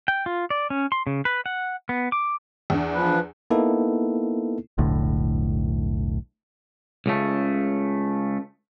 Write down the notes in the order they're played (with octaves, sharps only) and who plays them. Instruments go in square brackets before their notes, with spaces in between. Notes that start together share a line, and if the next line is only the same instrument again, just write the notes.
[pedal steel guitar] G5
F4
D5
C#4
C6
C#3
B4
F#5
B3
D6
[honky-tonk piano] E2 D4
[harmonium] F3 B4
[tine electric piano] A#3 B3 D#4 E4 A4
[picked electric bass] E1 B1 A2 D3
[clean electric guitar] C#2 C#3 A3